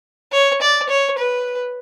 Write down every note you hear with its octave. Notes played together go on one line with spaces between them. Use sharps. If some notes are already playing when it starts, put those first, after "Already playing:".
C#5
D5
C#5
B4